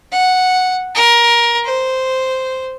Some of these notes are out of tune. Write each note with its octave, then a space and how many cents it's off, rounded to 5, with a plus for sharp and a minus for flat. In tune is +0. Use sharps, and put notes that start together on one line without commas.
F#5 -5
A#4 +20
C5 -5